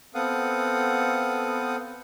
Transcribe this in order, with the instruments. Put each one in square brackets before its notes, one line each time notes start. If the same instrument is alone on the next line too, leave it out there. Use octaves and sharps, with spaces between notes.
[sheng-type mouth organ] B3 C4 A4 F5 F#5 D#6